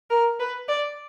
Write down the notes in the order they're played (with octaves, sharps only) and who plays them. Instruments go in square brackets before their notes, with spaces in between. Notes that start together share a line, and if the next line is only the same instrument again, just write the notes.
[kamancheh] A#4
B4
D5